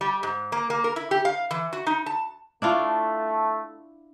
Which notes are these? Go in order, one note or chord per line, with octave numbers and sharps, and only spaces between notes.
G3
G#2
A#3
A#3
A#4
E4
G4
F5
E3
F#4
D#4
A5
A3 D4 E4 F4